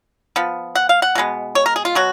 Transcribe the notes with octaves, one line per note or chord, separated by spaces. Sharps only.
F3 B3
F#5
F5
F#5
B2 G#3 B3
C#5
A#4
G#4
F4
B2 F#3 F#4